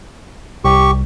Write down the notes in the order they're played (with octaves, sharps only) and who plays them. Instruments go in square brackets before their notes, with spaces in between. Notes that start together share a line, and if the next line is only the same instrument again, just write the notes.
[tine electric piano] C2 [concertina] G4 C#6